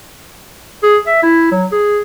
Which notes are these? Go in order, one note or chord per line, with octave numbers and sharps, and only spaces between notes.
G#4
E5
E4
F#3
G#4